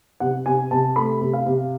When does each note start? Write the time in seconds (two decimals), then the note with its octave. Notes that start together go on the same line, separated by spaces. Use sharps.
0.20 C3 F#5
0.46 C3 G#5
0.71 C3 A5
0.96 A3 B5
1.21 C3
1.33 F5
1.46 C3